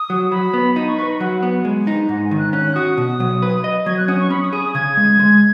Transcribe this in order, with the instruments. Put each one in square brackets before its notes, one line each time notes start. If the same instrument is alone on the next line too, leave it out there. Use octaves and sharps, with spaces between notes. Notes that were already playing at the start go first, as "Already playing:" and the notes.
Already playing: [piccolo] D#6
[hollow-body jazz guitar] F#3
[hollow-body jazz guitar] F#3 [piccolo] B5
[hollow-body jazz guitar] B3
[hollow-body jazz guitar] D#4 [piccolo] B5
[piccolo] C#6
[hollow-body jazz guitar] B4 [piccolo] C#6
[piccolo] B5
[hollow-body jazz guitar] F#3 [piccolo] F#5
[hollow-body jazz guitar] B3 [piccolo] F#5
[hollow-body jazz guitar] G#3
D#4
[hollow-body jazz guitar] G#2 [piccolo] F#5
[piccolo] G#5
[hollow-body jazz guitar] D#3
[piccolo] F#6
[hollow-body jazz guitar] C#4 [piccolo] F#6
[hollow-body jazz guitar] F#4 [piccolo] D#6
[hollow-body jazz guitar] B2
F#3
B4
D#5
[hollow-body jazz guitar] F#3 [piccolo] G#6
[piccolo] F#6
[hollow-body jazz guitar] C#4 [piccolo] D#6
[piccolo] C#6
[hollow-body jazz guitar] C#4 [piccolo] B5
[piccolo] D#6
[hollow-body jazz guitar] G#4 [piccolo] D#6
[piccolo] D#6
[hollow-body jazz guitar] C#3 [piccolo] G#6
[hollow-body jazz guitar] G#3
G#3